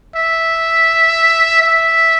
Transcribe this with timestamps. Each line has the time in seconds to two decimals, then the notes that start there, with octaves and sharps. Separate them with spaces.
0.15 E5
1.62 E5